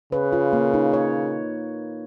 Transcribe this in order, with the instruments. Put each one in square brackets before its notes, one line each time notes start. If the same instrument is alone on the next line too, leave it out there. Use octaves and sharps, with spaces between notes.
[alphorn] C#3 [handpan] B4
[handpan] F4
A#3
D#4
C#5